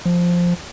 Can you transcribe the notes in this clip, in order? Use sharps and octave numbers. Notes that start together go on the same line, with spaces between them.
F3